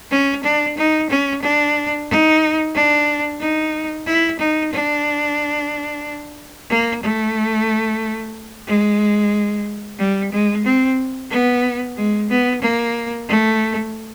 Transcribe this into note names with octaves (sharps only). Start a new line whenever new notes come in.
C#4
D4
D#4
C#4
D4
D#4
D4
D#4
E4
D#4
D4
A#3
A3
G#3
G3
G#3
C4
B3
G#3
B3
A#3
A3